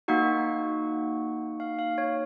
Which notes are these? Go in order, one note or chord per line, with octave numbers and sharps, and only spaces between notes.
A#3 D#4 F#4 F#5
F5
F5
C#5